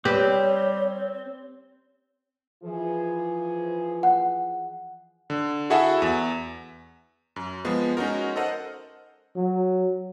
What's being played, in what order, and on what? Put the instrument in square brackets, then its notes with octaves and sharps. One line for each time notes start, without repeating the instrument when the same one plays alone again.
[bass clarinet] G3 [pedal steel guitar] C4 [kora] G4 B4 [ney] C#5
[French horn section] E3 F3 G#4
[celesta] F#5
[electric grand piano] D3
E4 F#4 G#4 A4 E5 F#5
E2
F#2
F3 G#3 B3
G#3 C#4 D#4 F#4 A#4
A4 A#4 C5 D#5 F#5
[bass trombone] F#3